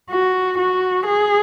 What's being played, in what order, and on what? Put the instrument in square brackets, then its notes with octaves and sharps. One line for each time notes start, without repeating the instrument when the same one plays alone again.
[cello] F#4
F#4
G#4